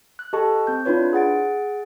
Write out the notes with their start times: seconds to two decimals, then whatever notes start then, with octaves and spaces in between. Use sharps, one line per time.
0.19 F#6
0.33 G4 A4 D#5 A5 C#6
0.67 C4 G6
0.86 D4 E4 F4 B4 C#5
1.13 G#4 F#5 A6 D7